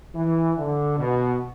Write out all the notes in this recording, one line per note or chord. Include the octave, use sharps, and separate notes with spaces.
E3
D3
B2